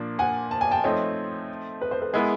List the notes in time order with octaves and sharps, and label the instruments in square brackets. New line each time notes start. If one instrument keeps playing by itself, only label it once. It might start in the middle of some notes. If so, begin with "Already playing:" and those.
Already playing: [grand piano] A#2 F3 A#3 D4
[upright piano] F#5 G#5
A5
G#5
G5 A5
[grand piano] F3 A3 C4 D#4 [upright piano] C#5 D#5
[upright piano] B4
C5
A4 B4
[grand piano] G#3 B3 E4 [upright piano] G#4 A#4